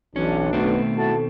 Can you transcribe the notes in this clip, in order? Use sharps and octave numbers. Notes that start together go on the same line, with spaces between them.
B1 E3 C#4 D4
B2 D#3 A3 B3 C4
E4 F#4 A4 A5